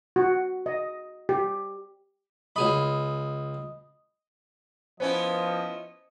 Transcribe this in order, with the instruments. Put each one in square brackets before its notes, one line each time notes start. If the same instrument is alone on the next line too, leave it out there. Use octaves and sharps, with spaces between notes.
[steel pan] F#4
D#5
G4
[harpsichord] C#2 G#4 B5 [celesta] D#5 D#6
[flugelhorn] F3 [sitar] B3 C#4 E4 [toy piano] C5 [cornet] D#5